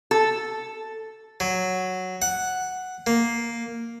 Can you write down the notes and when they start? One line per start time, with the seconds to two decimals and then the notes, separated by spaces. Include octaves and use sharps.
0.11 A4
1.40 F#3
2.22 F#5
3.07 A#3